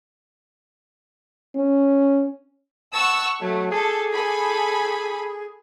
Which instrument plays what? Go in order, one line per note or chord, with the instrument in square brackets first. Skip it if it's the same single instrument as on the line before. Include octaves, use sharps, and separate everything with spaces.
[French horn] C#4
[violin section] F#5 C#6 E6 [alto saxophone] A5
[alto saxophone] F#3 [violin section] A3
[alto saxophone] G#4 [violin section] A4
[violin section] A4 G#5 B5